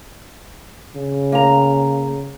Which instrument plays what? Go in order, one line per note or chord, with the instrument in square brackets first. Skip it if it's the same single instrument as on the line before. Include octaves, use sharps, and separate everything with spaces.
[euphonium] C#3
[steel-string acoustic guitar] A#3 A#5